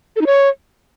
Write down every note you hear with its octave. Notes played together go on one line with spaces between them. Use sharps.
A4
D#4
C#5